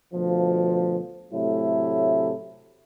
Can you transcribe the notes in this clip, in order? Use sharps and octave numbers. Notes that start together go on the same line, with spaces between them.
D2 B2 F3
A2 C3 F#3 A3 E4